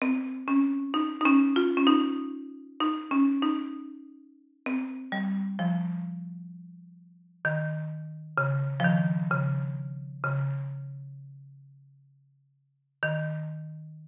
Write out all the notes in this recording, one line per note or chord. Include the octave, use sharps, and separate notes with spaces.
C4
C#4
D#4
D#4
C#4
F4
C#4
D#4
D#4
C#4
D#4
C4
G3
F3
D#3
C#3
F3
D#3
C#3
C#3
D#3